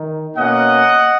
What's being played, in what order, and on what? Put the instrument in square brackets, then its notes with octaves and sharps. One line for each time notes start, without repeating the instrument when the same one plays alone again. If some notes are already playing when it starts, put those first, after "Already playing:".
Already playing: [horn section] D#3
B2 A#3 C#4 D#5 F#5